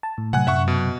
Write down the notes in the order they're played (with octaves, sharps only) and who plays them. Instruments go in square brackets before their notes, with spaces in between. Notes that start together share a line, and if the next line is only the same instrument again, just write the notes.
[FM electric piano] A5
A2
[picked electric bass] C3 F#3 [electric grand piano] F#5 G#5 F#6
[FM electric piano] F#2 [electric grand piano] E5 F#5 C#6
[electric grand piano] B2